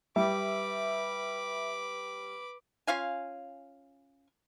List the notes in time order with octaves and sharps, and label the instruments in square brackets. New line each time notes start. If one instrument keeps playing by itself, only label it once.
[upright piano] G3 [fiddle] B4 D6 [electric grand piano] E5
[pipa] C#4 F4 F5 G#5